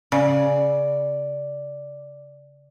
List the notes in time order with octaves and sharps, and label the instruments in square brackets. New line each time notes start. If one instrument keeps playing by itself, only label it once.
[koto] C#3 [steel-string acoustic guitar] D5